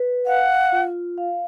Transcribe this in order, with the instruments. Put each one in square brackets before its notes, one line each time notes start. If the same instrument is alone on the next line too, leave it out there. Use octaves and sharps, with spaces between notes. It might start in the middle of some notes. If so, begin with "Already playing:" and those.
Already playing: [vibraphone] B4
[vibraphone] F5 [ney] F#5
[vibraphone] F4
F5